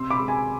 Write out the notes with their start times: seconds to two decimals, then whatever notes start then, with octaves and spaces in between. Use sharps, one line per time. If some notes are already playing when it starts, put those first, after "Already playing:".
Already playing: C3 C6 E6
0.10 B5 D6
0.19 G#3
0.28 G#5 B5